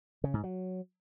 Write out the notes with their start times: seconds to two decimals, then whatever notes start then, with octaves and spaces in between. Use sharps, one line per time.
0.24 C#3
0.34 G#2
0.44 F#3